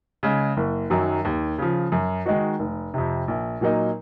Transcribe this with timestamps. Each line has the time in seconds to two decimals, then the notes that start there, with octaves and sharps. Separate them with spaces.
0.23 C#3 G#3
0.57 F#1
0.90 F#2 D#3 F#3
1.25 D#2
1.58 C#3 F3
1.92 F#2
2.26 D#3 G#3 D#4 F#4
2.59 F1
2.94 F2 C3
3.28 A#1
3.61 A#2 F#3 A#3 D#4